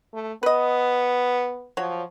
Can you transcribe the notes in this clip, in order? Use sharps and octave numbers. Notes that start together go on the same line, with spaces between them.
A3
B3 B4 D#5
F3 F#3 C#5